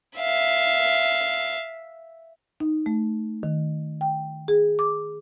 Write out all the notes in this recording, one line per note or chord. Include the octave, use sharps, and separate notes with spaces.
E5 F5
D#4
A3
D#3
G5
G#4
D6